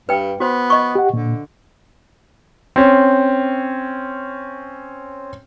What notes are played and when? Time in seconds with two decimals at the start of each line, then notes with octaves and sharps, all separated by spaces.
0.09 G2 B4 G5
0.40 B3 F#4 C5
0.70 D#5 C#6
0.95 G4 F#5
1.14 A#2 D3
2.76 C4 C#4